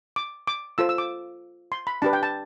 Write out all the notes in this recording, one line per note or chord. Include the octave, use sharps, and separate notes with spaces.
D6
D6
F4 A4 C5 E6
E6
D6
C6
B5
D4 G4 B4 A5
G5
A5